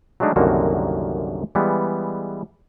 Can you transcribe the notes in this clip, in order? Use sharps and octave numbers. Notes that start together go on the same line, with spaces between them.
F#3 G#3 A3 D4 D#4
C2 F#2 D3 D#3 A#3 F#4
E3 G3 G#3 B3